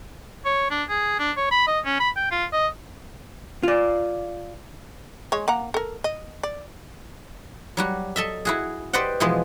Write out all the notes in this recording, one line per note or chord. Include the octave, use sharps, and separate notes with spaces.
C#5
D4
G#4
D4
C#5
B5
D#5
C#4
B5
G5
F4
D#5
F4 D5
G#3 C#5
A#3 F#5 A#5
A4 A#4
D#5
D5
F#3 G3 F#4
A4 D#5 E5
E4 F#4 G#4
G4 B4 C5 D5 D#5 F#5
B2 E3 F3 G#3 B3